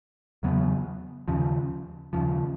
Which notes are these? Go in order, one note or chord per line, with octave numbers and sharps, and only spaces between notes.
E2 C#3 F#3 B3
D#2 C#3 F3
D#2 C#3 F3